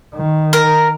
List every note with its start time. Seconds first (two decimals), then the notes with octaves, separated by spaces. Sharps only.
0.16 D#3
0.53 A#4